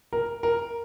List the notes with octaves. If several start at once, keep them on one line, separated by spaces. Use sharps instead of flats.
A#4
A#4